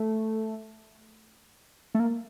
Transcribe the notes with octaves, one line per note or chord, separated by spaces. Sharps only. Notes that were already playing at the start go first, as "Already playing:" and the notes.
Already playing: A3
A3
A#3